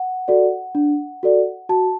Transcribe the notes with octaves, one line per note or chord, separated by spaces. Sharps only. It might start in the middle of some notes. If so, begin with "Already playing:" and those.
Already playing: F#5
F#4 A4 D5
D4
F#4 A4 D5
F#4 A5